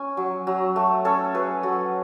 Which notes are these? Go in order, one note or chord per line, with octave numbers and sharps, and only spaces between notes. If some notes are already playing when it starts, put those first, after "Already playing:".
Already playing: C#4 G#5
F#3
F#3
A3
C#4 A4 C#5
F#3 G#4 B4
F#3 F#4 A4